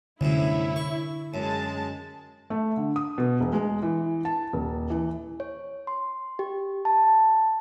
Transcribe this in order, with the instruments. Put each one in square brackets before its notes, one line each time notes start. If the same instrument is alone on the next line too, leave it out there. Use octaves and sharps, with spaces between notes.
[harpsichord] C2 F#2 A2 [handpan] D3 [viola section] E4
[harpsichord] C#6
[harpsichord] F#2 [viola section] G#3 A5
[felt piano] A3
D3
D#6
B2
E1
G#3
E3
A5
D#1
E3
[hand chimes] C#5
C6
G4
A5